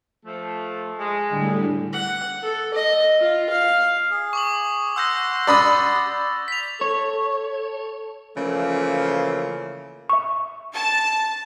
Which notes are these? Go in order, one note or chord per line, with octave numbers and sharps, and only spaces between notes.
F3 A3
G#3
A2 D3 G3
F#5
A4
D#5
F4
F5
G#4
C#6 D6 F#7
F#5 C6 E6 G6 A#6
D5 B5 D#6 A6
B6 F7
A4 C#5
C#3 E3 F3 A3 A#3
E5 C#6
A5